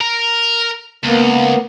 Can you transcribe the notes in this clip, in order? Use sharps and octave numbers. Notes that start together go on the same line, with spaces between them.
A#4
C#2 A#3 B3